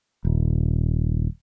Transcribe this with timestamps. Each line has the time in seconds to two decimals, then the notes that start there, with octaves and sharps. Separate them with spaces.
0.25 D#1